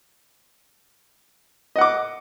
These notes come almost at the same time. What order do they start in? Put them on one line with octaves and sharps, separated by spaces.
D#5 F#5 D6